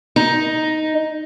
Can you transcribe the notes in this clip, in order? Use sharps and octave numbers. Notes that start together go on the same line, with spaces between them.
D#4